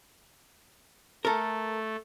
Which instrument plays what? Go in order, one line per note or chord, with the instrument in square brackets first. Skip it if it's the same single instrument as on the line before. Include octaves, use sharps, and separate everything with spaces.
[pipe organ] A3 [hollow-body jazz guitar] A4 A#4